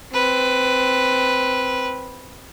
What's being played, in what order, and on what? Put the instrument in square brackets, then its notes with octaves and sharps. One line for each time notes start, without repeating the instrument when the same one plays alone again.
[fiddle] C4 B4